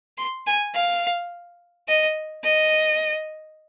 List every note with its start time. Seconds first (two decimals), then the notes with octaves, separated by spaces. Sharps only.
0.18 C6
0.47 G#5
0.75 F5
1.88 D#5
2.44 D#5